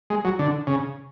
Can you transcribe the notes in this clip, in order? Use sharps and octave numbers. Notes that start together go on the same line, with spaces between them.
G#3
F#3
D3
C#3